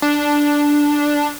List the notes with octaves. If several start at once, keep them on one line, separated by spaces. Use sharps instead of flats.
D4